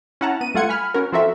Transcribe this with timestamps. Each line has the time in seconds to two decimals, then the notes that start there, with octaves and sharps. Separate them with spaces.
0.21 C#4 E4 F#5 A5 A#5
0.41 B3 D#7
0.54 G3 A3 F4 F#5 G#6 C#7
0.69 G#5 B5 F6
0.94 C#4 F#4 A#4
1.12 F3 C4 F#4 A4 A#4 E5